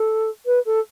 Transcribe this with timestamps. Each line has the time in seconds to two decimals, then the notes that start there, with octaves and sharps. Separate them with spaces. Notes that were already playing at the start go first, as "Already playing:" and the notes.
Already playing: A4
0.46 B4
0.65 A4